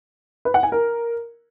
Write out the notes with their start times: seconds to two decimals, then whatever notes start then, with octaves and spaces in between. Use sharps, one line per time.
0.45 B4
0.54 F#5
0.63 G#5
0.72 A#4